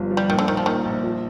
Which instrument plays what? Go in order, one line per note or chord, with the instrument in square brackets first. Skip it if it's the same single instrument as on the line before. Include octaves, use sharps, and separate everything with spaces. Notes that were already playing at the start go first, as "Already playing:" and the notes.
Already playing: [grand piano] G1 G2 F3
F3
[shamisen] G3
[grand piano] A#1 [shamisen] D#3
[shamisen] D3
[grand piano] A#1 [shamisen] D#3
[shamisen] F3
[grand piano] A#1 [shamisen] D#3
[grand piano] A#1
F3